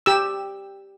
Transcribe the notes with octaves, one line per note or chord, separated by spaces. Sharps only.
G4 E6